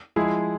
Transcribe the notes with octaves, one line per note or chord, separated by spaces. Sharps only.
F3 G#3 E4 G#4